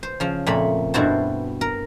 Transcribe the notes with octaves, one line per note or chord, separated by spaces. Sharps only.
C5
C#3 F3
F2 A#2 A3 B5
G2 B2 E4 F#4 C5 A5
A#4